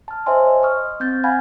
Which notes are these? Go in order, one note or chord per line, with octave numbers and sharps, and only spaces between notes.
A5 F6
C5 C#5 D#5 E5 G#5 C6
D#5
D#5 C#6 D#6 F6
C4 G6 A6
F5 F#5 G#5 B5 F6 G#6